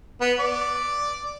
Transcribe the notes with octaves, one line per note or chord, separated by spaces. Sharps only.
B3
D5